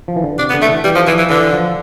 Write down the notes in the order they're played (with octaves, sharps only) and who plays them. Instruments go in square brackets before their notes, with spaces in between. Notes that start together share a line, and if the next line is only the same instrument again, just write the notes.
[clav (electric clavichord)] F3
E3
D3
[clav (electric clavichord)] C3 [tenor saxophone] D4
[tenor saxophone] B3
[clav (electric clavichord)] D3
[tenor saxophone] A3
[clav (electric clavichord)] E3
[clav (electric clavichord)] E3 [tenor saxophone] G3
[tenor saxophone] F3
[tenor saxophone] E3 [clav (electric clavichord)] F3
[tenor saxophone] E3
[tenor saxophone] D3 [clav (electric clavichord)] E3
[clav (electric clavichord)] F3